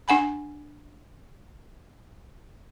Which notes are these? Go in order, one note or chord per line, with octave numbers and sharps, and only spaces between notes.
D4 F#5 G#5 B5